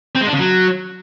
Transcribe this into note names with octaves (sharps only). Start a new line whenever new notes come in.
C4
G#3
D4
C#3
F#3